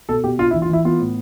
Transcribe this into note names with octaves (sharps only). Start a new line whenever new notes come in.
B2 A4
B2 G4
D4 F4
E4
E3
F4
E3 E4
B3 F4
A2